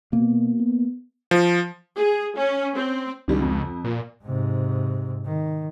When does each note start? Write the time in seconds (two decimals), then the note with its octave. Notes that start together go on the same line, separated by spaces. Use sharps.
0.13 B2 A#3
0.60 B3
1.31 F3
1.97 G#4
2.37 C#4
2.75 C4
3.28 C#2 D#3 G3 D4
3.41 F2
3.84 A#2
4.23 G#2 C3
5.25 D#3